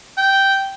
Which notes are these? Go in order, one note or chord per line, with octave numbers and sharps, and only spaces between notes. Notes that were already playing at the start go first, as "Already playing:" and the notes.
G5